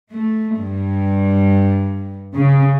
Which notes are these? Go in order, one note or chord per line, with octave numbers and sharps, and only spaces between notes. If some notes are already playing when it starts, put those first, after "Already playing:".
A3
G2
C#3